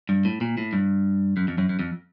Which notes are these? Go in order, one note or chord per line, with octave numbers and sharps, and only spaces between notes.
G2
A2
A#2
A2
G2
F#2
F2
F#2
F#2
F2